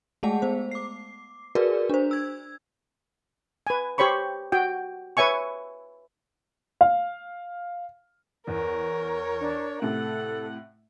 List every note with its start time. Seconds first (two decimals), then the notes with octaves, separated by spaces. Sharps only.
0.23 G#3 A3 G#4 F#5 A5
0.42 B3 C5
0.71 D6 C7
1.55 F#4 G#4 A#4 B4 D5
1.90 D4 C5
2.11 E6 G#6
3.67 B4 G#5
3.98 G4 C5 C#5 B5 C#6
4.52 F#4 G5
5.17 B4 C#5 E5 G#5 C#6
6.81 F5
8.47 E2 A#4 C#5
9.41 D4
9.82 A2 C3 A4 F#5